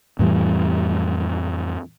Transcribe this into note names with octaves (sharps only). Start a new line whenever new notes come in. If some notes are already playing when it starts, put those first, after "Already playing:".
F2 A2 E3 G3